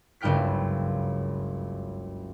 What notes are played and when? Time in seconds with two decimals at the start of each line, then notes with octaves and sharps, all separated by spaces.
0.21 F#1 C#2 G2 G5 F6 B6